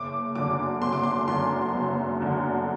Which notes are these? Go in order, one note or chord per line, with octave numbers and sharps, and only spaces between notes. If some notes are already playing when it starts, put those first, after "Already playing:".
Already playing: F#1 D6
F#2 D3 D6
F#1 C6
D6
C6
F#2 D3 C6
F#1
F#2 D3